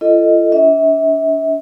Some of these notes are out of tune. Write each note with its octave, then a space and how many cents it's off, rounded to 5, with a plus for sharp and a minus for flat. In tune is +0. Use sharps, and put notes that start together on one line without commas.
F4 -40 A4 +0 D#5 +0
D4 -40 E5 -35